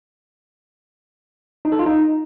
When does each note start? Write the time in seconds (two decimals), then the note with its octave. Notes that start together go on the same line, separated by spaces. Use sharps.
1.65 D#4
1.72 A4
1.79 F4
1.86 D#4